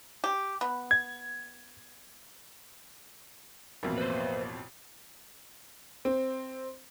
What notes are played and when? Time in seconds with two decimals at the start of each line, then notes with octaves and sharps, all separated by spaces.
0.24 G4
0.61 B3
0.91 G#6
3.83 A1 F2 B2 A#3 E5 F5
3.98 B4 C5
6.05 C4